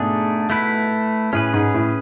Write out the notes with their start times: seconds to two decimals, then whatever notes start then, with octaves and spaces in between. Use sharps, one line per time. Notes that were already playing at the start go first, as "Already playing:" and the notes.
Already playing: G#2 B2 A3 D4 G#4
0.50 A3 E4 B4
1.33 A2 C#4 G#4 B4
1.53 G#2
1.74 A2